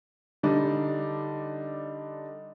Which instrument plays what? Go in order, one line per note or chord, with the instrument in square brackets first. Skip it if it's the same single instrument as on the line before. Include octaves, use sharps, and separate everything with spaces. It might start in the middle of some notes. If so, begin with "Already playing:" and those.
[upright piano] D3 G3 D4 D#4